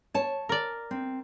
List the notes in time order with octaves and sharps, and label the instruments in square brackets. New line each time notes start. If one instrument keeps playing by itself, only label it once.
[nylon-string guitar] C#5 A5
[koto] A#4 D5
[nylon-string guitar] C4